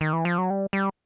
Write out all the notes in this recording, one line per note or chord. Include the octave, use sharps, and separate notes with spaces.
D#3
E3
F3
F#3
G3
G3